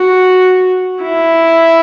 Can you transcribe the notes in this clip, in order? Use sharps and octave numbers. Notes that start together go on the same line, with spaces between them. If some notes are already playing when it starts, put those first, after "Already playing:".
Already playing: F#4
E4